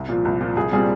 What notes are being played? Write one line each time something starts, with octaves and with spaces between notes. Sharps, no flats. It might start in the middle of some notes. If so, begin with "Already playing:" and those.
Already playing: C2
A#2 F3
C2
A#2 F3
C2 G#4
A#2 G3 C4 G#4